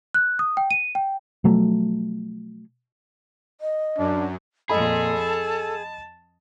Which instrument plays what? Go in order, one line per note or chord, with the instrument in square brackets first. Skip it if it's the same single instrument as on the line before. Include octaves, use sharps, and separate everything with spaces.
[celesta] F#6
D#6
G5
D#7
G5
[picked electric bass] B2 F3 F#3 A3
[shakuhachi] D#5
[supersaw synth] F#2 [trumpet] D4
[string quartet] F2 A#2 [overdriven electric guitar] G#4 [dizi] A4 [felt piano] D#5 B5
[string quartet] A5